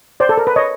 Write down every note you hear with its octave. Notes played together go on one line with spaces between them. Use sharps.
C5 D5
A4
A#4
B4
C#5 D#5